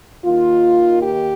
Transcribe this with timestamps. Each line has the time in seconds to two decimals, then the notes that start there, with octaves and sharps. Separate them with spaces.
0.24 D#2 D#3 A#3 F4
1.01 G4